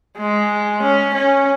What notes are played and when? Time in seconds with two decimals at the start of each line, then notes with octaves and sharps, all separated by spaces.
0.18 G#3
0.83 C#4
1.14 C#4